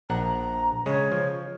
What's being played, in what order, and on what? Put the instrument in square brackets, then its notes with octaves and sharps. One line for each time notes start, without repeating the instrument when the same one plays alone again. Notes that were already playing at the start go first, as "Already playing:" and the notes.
[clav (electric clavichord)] A#1 D4 F#5 [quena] A#5
[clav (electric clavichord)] C#3 G#3 [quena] C#5
[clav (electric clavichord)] F3